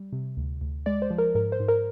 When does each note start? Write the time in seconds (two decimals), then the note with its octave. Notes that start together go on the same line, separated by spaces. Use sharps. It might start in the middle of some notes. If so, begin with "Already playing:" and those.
Already playing: G3
0.12 C3
0.37 D2
0.61 D2
0.86 G#3 D5
1.02 C5
1.10 F3
1.18 A#4
1.35 G#2 A#4
1.52 C5
1.60 G#2
1.68 A#4